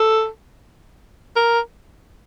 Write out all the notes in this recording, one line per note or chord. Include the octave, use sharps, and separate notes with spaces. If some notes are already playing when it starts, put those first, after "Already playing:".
Already playing: A4
A#4